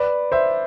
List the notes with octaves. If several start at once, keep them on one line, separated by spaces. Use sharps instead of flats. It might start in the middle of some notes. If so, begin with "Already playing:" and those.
Already playing: B4 D5
C5 E5